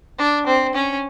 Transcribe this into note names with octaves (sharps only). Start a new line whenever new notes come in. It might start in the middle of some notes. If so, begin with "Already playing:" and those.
D4
C4
C#4